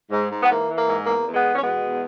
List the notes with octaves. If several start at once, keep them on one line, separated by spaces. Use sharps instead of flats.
G#2
G#2
B3
E3 A#3
E3
A#3
G#2
E2 A#3
E2
G#3 B3
E2
C#4
B2 G#3 B3
E2